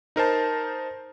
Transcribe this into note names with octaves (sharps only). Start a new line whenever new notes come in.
D#4 A#4 C5 A5